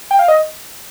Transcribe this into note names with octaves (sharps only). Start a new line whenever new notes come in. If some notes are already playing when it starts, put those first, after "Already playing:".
G5
F5
D#5